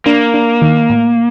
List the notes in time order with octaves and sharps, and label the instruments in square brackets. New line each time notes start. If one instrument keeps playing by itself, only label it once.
[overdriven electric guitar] A#3 [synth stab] D4
[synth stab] D4
D#3
A2